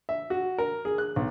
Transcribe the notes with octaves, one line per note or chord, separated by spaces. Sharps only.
E5
F#4
A#4
G#4
F#6
B1